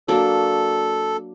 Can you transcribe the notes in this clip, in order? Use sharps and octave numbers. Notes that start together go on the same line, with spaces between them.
F#3 A#3 D4 A4